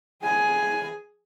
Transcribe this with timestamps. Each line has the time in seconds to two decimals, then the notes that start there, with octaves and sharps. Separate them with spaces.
0.23 G#4 G#5